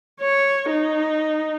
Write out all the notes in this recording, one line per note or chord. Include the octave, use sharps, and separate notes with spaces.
C#5
D#4